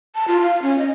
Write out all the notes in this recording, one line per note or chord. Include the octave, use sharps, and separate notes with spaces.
A5
F4
F5
C#4
D#5